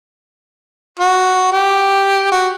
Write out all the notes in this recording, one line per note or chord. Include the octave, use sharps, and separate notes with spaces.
F#4
G4
F#4